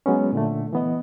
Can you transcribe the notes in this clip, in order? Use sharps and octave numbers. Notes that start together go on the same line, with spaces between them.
F#3 G#3 B3 C#4
A#2 D3 A3
E3 B3 D#5